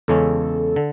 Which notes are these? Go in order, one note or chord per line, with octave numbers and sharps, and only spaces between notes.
E2 C#3 G#3 C#4 A4
D3